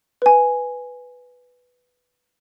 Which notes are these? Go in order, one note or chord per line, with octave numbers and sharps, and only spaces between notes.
B4 G#5